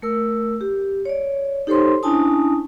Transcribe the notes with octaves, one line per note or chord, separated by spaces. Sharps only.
A3 A#4 E6
G4
C#5 D5
D#4 G4 A4 C5 C#5 C6
C#4 D4 E4 G#5 A5 D#6